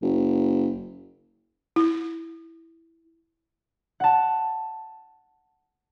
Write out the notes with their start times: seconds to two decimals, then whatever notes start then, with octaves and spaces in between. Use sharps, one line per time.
0.02 F#1
1.76 E4
4.00 F#5 A5